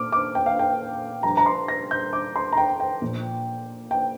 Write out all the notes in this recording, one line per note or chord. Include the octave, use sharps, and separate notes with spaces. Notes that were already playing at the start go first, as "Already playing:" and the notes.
Already playing: A#2 D6 F6
D6
G5
F5
G5
G2 F3 A#5
A#5
C6
A#6
G6
D6
C6
A#5
G5
G5
A#2 F3
G5